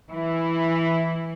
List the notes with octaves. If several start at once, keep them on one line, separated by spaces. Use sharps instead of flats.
E3 E4